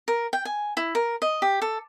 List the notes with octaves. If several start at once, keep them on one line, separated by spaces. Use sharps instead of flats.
A#4
G5
G#5
E4
A#4
D#5
G4
A4